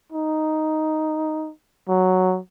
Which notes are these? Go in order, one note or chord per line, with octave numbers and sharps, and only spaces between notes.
D#4
F#3